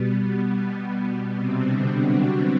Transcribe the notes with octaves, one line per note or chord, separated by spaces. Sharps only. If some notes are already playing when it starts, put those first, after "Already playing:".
Already playing: B2 G3 B3
B3
B3
B2 G3 B3
C3 C4
D3 D4
F#3 F#4